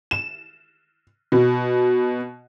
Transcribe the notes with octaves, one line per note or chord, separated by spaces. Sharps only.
E7
B2